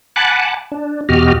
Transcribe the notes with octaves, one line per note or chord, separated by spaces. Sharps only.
F#5 G#5 A5 B5 D6 F#6
D4
E2 B2 F#4 G4 D#5 F6